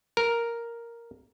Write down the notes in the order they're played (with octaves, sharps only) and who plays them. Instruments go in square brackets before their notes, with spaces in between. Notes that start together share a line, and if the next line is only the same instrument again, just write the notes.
[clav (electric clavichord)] A#4